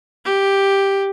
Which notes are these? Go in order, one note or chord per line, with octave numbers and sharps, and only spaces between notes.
G4